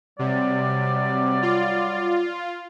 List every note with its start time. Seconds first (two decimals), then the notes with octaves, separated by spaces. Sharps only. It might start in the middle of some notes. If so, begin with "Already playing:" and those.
0.19 C3 F#3 G3 D5
1.42 F4